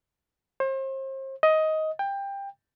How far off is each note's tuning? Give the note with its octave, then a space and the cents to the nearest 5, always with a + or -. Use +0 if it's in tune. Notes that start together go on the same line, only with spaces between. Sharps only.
C5 +40
D#5 +15
G5 +20